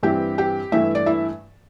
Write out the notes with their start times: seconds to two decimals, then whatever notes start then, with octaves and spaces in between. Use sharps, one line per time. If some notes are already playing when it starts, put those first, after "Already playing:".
0.03 G2 E3 C4 E4 G4
0.38 G4
0.72 G2 E3 A3 E4 E5
0.95 D5
1.06 E4 E5